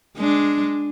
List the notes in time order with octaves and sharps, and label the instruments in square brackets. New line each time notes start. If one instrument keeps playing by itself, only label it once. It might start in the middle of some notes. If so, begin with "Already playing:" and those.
[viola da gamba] G#3 D4